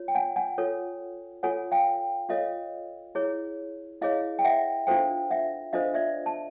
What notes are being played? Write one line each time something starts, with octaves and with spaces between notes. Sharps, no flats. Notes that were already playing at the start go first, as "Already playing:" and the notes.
Already playing: F4 C#5
G5
F#5 G#5
F#5 G#5
F4 A4 C#5
F4 A4 C#5 F#5 G#5
F5 G5
F4 A4 C#5 D#5 F5
E4 G#4 C#5
E4 G#4 C#5 D#5 F5
G5
E5 F#5
D4 F4 A4 C5 F5 G5
E5 F#5
D4 F4 A4 C5 D#5 F5
D5 E5
A5